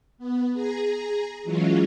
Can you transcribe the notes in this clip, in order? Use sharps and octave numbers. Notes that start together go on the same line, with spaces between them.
B3
G#4 A#5
E3 F#3 G#3 C#4 F4